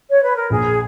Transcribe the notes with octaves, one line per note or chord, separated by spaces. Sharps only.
C#5
B4
A#4
A#1 G#4